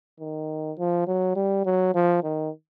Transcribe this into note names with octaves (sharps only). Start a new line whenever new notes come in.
D#3
F3
F#3
G3
F#3
F3
D#3